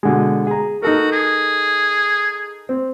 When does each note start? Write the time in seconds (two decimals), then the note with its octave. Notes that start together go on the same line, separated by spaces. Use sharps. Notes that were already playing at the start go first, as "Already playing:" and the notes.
0.03 B2 D3 G#3
0.47 G#4 A#5
0.82 D#4 F#4 A4 A#4
1.12 G#4
2.69 C4